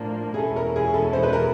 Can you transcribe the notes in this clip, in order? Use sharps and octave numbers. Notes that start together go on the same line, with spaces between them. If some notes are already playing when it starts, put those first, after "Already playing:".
Already playing: A2 F3 A#3 D4
G#4
E2 B2 G#3 C#4 E4 A4
A#4
G#4
A4
C5
B4
A#4